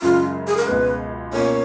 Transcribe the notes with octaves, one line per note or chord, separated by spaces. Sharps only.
F#2 C#3 G#3 F4
G#4
A#4
C#2 B2 G#3 B4
B2 A#3 C#4 F4 C#5